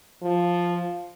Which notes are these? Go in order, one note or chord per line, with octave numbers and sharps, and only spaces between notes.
F3